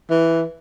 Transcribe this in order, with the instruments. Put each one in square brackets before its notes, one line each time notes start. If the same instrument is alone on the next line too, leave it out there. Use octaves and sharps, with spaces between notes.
[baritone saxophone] E3